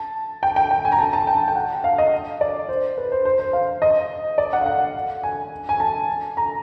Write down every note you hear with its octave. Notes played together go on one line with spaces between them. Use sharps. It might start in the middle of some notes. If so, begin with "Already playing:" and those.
Already playing: A5
G5
G5
G5
G#5
A#5
A5
A5
G5
G5
F#5
F5
D#5
D5
C5
B4
C5
C5
C5
F5
D#5
D5
F#5
F5
F#5
G#5
G#5
A5
A#5